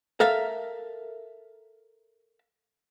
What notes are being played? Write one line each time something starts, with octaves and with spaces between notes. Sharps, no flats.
A4 A#4 E5 F5